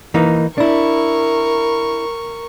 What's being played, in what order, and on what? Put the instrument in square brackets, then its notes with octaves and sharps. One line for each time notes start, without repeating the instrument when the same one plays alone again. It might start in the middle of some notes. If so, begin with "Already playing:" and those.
[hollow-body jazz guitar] E3 A#3 D#4
[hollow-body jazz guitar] D4 E4 [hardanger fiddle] A#4 C#6